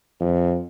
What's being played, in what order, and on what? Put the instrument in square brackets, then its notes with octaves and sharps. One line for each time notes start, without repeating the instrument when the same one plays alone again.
[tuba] F2